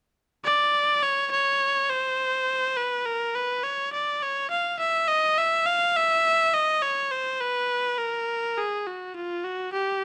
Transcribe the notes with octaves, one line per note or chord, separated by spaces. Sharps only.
D5
C#5
C#5
C5
B4
A#4
B4
C#5
D5
C#5
F5
E5
D#5
E5
F5
E5
D#5
C#5
C5
B4
A#4
G#4
F#4
F4
F#4
G4